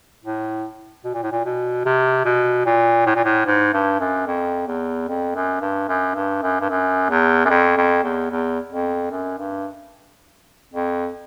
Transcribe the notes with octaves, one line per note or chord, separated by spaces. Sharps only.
A2
B2
A#2
A2
A#2
B2
C3
B2
A#2
A2
A#2
A2
G#2
G2
F#2
F2
E2
F2
F#2
G2
F#2
G2
F#2
G2
F#2
E2
F#2
F2
F2
E2
E2
F2
F#2
G2
F2